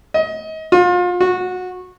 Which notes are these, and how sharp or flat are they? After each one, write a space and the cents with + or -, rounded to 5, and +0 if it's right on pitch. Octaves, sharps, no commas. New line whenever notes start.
D#5 +30
F4 +35
F#4 -20